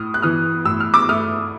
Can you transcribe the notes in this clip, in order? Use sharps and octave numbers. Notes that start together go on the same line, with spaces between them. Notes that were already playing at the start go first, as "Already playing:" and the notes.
Already playing: A2 D#6 F6
F#6
E3 D#6 F6
A2 E6
F6
D6 E6
A3 D#6 F6